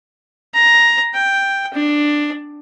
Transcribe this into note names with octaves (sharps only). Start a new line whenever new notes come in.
A#5
G5
D4